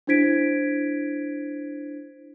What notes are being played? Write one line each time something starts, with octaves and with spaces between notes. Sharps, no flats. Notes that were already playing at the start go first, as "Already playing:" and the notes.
D4 E4 C5 G#6 B6 D7